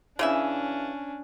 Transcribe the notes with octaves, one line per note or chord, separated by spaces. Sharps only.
C#3 E3 C#4 D4 E5